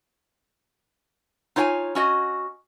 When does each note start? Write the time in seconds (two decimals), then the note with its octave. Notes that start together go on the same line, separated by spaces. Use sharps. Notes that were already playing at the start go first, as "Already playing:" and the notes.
1.56 D#4 F4 C#5 G5 G#5
1.95 C#4 F#4 D#5